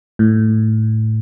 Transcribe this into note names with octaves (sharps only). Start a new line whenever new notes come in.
A2